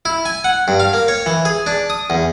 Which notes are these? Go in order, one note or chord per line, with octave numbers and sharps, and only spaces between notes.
E4
G#5
F#5
G2
F5
A#3
C#5
E3
G#4
D4
D#6
E2